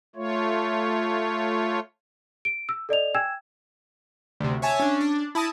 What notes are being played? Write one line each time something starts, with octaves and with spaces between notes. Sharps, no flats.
A3 F4 C#5
D7
E6
A4 D5 D#5 F7
G5 G#5 E6 G#6 E7
D2 C3
C#5 E5 G#5 A5
C#4 D4
D4
E4 A5 D#6 A#6